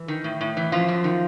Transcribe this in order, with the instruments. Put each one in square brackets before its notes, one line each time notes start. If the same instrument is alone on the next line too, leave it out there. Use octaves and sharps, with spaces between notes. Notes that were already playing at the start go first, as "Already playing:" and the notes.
Already playing: [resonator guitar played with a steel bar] E3
D#3
A2
A2
E3
F#2 F3 F4
F#2
D#3